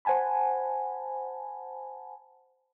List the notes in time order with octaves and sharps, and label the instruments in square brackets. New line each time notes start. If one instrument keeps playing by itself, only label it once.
[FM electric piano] C5 F#5 G#5 A5 B5